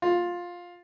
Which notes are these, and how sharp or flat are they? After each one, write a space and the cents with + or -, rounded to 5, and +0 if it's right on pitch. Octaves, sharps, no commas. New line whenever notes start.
F4 +10